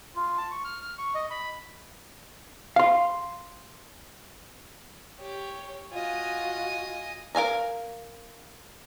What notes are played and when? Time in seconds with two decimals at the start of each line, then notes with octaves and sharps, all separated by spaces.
0.16 F4
0.38 A5
0.51 C#6
0.64 F6
0.81 F6
0.98 C#6
1.15 D#5
1.30 B5
2.76 F5 C6
5.20 G4 C#5
5.93 F4 F#4 D#5 G#5
7.35 A#4 F5 G#5 A#5